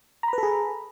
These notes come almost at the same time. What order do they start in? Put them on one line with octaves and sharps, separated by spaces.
A#5 B5 B4 A4 G#4